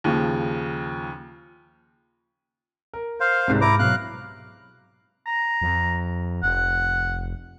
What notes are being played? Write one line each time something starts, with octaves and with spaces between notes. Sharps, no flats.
D#2 C#3 F3
A#4
C5 F5
C2 G#2
G#2 E4 A#5 D6
B2 F#3 F5 F#6
A#5
F2
F1 F#5